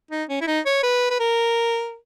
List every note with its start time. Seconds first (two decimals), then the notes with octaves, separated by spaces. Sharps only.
0.11 D#4
0.29 C#4
0.41 E4
0.47 D#4
0.66 C#5
0.83 B4
1.11 B4
1.20 A#4